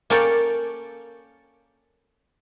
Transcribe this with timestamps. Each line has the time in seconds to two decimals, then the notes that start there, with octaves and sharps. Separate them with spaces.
0.10 A#3 C#4 A4 C#5 D5 G5